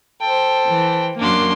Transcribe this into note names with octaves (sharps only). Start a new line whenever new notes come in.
A4 C5 G5
E3
F#2 A#3 D4 C6